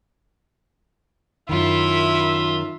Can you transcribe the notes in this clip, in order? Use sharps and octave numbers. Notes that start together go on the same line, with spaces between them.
F#2 D#3 E4 F4 E5